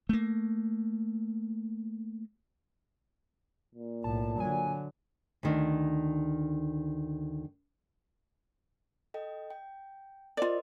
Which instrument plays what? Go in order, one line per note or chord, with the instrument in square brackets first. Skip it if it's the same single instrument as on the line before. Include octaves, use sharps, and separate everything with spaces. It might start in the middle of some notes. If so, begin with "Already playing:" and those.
[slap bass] A3 A#3
[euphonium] A#2
[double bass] B1 A2 [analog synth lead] A5
[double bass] D3 F#3 [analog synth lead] G#5
[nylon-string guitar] D2 D#3 D4
[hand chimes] A4 D#5 G5
G5
[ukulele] F4 D5 [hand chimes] A#4 C5 D#5